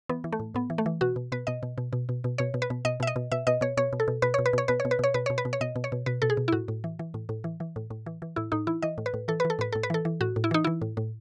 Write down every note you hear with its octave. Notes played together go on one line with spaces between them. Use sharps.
E3 B3
E3
A3
A2
A2 B3
E3
A3
E3
B2 F#4
B2
B2 B4
B2 D#5
B2
B2
B2
B2
B2
B2 C#5
B2
B4
B2
B2 D#5
B2 E5
D#5
B2
B2 E5
B2 D#5
B2 C#5
B2 C#5
B2
A4
B2
B2 B4
B2 C#5
B4
B2 C#5
B2 B4
C#5
B2
B4
B2 C#5
B2 B4
B2 C#5
B4
B2
C#5
B2 D#5
B2
C#5
B2
B2 B4
B2 A4
G#4
B2
E4
A2 F#4
A2
E3
E3
A2
A2
E3
E3
A2
A2
E3
E3
A2 E4
A2 D#4
E3 E4
E3 D#5
A2
B4
A2
E3 A4
E3 B4
A4
A2 B4
A2 A4
B4
E3 A4
E3
A2 F#4
A2
E4
E3 D#4
E3 E4
A2
A2